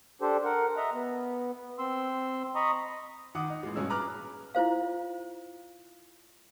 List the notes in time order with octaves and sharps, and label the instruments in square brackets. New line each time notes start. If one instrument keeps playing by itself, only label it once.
[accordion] D4 G4 A4 C5
A#4 F#5
D#5 E5 A#5
B3
C4 C6 E6
D#5 A#5 B5 C#6 D#6
[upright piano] D#3 F#5 D6 D#6
D#4
A1 A#2 G#3
G2 B2 C#4 G#4 E6
B4 A#5 D6 F6 F#6
[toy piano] E4 F4 C5 F5